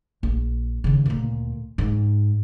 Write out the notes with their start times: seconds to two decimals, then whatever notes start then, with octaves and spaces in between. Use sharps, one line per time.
0.23 A#1
0.84 D#2 C#3
1.06 D2 A#2
1.78 G#2